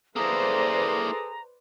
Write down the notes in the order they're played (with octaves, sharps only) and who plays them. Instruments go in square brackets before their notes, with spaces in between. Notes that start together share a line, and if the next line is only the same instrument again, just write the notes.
[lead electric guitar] A#3 E4 [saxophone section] G#4 A4 [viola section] B4 C5 D5 [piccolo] A#5